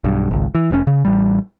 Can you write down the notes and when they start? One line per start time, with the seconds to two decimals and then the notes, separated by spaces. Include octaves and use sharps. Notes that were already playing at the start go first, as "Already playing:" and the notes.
0.04 B1 G2
0.31 G#1 C#2
0.55 E3
0.71 F1 A#2 C#4
0.87 C#3
1.05 A1 G3